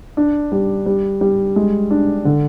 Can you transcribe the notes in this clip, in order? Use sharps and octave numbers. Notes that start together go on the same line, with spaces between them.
D4
G3
G3
G3
G#3
D4
D3